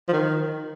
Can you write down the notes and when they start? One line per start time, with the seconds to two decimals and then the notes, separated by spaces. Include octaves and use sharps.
0.08 F3
0.13 D#3